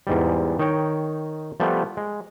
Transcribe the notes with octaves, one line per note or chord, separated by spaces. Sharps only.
E2 G#2 G3
D#3 D#4 C#5 G5
F3 G3 A3 B3
G#3